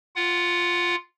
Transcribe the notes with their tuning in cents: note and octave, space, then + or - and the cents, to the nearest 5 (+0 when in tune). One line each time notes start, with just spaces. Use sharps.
F4 +0 F#5 +10